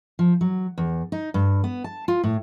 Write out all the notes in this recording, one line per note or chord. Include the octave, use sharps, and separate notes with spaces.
F3
F#3
E2
D#4
G2
B3
A5
F4
A2